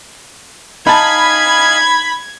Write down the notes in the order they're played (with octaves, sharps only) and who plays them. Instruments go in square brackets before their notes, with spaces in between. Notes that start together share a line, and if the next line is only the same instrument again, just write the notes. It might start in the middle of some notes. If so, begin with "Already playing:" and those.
[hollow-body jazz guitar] D#4 A5 [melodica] D#5 F5 G#5 [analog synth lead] B5 [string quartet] G#6